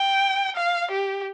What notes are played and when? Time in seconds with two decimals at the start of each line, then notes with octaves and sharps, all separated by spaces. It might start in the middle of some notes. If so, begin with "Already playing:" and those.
Already playing: G5
0.56 F5
0.91 G4